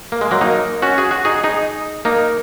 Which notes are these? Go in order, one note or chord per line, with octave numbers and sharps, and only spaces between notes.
A#3
G#3
F#3 A#3
A#3 D#4
C#4 F#4
G#4
F#4
D#4 G#4
D#4 G#4
A#3 D#4